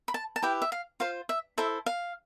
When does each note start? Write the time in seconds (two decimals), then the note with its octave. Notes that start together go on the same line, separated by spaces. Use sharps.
0.08 B5
0.14 A5
0.36 A5
0.42 E4 G4 B4 G5
0.62 E5
0.72 F5
1.00 F4 C5 F5
1.29 E5
1.58 E4 A4 C5 E5
1.86 F5